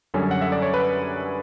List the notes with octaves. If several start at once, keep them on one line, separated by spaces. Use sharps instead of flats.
F#2 D3 G3 C#4 A4
F#5
E5
D5
C#5
B4